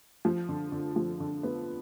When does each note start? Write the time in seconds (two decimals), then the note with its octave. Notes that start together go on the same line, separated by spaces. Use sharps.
0.25 F3
0.49 D3
0.72 D3
0.96 F3
1.20 D3
1.43 B3